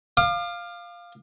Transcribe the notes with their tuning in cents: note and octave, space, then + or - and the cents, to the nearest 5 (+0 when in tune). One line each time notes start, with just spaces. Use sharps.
F5 +0 D6 +40